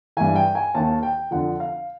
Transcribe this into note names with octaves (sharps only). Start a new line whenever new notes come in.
G2 E3 G#5
G5
G#5
D#2 D#3 A5
G5
F2 D3 F3 F#5
F5